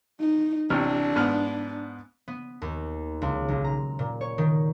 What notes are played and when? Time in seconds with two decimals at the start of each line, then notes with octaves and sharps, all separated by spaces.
0.20 D#4
0.70 A1 C3 D4 F6
1.16 G#2 B3 F6
2.28 B3
2.62 D#2
3.22 C#2
3.48 B1
3.64 A#5
3.99 A#2
4.21 C#5
4.38 D#3